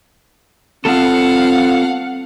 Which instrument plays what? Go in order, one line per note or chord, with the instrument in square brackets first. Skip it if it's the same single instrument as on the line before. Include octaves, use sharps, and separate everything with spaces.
[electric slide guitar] B3 F4 A4 [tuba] C4 [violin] F5 F#5